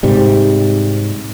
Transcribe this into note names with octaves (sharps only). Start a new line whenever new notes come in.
G#2 C3 G3